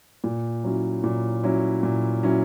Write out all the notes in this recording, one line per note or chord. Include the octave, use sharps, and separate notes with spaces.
A#2
F#3 C#4 E4
A#2
F#3 C#4 E4
A#2
F#3 C#4 E4